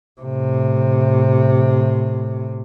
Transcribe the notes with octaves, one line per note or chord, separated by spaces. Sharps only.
A2 C3